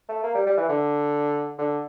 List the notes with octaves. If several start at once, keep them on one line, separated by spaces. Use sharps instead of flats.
A3
A#3
G3
G3
E3
D3
D3